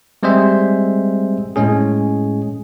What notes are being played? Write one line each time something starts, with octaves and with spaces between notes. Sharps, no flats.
G3 G#3 C4 G#4 C5 E5
A2 G#3 C#4 G#4